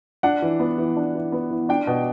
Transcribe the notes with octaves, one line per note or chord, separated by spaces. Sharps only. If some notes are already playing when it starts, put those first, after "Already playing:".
D4 F#5
E3
B3
E3
D4
E3
B3
E3
D4 G5
B2